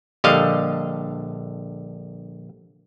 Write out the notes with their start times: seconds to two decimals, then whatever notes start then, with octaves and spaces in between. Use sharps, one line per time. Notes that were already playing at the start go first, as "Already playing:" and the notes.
0.24 A#1 D3 G3 D#5 F5